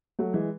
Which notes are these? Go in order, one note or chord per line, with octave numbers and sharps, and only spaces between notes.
F#3 A3
E3 G#3